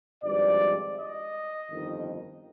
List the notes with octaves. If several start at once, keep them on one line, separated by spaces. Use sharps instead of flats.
G#1 G2 F3 G#3 D5
D#5
G1 F2 D#3